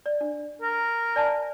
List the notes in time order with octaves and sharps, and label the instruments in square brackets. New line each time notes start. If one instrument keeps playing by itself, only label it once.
[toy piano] D5
D4
[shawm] A#4
[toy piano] D5 G#5 A5